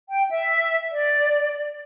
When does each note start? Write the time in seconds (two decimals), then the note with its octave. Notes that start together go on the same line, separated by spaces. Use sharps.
0.09 G5
0.30 E5
0.92 D5